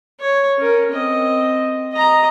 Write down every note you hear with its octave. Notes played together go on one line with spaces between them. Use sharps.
C#5
C#4 A#4
C4 D#5
D#5 A#5